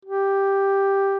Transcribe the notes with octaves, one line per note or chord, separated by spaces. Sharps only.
G4